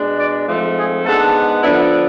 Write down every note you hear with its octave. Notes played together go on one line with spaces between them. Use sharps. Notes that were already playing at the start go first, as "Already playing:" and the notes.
Already playing: B2 G#3 D4
D5
G#2 F3 A3 C4 C5
G#4
G#2 G#3 B3 D4 A4
D3 F3 B3 D4 E4